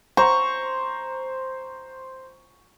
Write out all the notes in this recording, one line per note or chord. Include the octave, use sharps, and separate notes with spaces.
C5 A#5 C#6